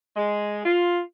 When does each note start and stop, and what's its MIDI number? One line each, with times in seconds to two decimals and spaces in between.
0.17 0.65 56
0.65 1.00 65